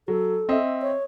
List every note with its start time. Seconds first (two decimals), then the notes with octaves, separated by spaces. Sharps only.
0.08 F#3 A4
0.49 C4 D#5 E5
0.82 C#5